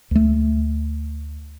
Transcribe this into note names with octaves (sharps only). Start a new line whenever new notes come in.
D2 A3